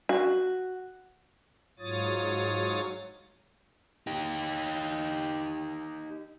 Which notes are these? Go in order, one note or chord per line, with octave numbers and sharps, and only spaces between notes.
F#4
G#2 F#3 F4 C#5 D#6 A6
D#4 G4